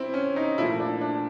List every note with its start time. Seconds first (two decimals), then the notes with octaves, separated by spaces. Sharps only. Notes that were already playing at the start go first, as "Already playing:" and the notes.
Already playing: C3 C4 E4
0.14 C#4
0.36 D#4
0.58 A#2 F3 A3 E4
0.80 D4
1.01 D4